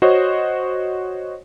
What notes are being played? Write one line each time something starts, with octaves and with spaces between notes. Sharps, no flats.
F#4 C5 C#5 D#5